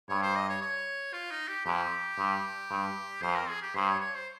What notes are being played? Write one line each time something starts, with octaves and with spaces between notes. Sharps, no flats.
G2 C#5
C5
D#5
C#5
C#5
F4
D#4
G4
F2 G4
G2
G2
F2 C5
A#4
G#4
G4
G2 C5
C#5
C#5
C5